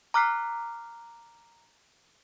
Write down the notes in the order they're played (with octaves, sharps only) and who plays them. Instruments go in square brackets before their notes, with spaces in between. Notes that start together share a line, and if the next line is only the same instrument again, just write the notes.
[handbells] A#5 D6 F6 F#6 B6 C7